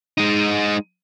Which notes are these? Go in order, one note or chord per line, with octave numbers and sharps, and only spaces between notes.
G#3 D#4